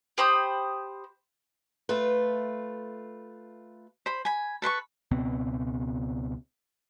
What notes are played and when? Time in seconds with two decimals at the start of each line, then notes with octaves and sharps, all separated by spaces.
0.18 G4 C5 B5 D#6
1.89 A3 F4 B4
4.06 C5 B5
4.25 G#5 B5
4.62 A4 B4 C6 C#6
5.11 C#2 B2 B3 C4